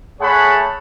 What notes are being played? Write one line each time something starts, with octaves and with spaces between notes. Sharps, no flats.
A3 G#4 C#5 F#5 A5 B5